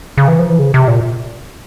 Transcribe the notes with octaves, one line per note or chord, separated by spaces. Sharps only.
C#3
E3
F3
E3
C#3
C3
A#2